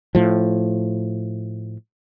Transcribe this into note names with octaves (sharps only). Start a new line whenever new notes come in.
A2 F3